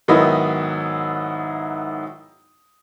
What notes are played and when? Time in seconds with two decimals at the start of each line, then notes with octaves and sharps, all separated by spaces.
0.08 G#2 D#3 F#3 B3 E4 D#5